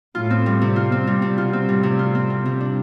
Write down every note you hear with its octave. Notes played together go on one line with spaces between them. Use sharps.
A2 F4
C4
G3
C3
F4
C4
G3
C3
B2 F4
C4
A2 G3
C3
A2 F4
C4
G3
C3
D4